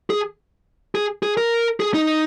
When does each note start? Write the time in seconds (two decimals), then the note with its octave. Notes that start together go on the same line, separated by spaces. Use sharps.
0.10 G#4
0.95 G#4
1.23 G#4
1.37 A#4
1.80 G#4
1.94 D#4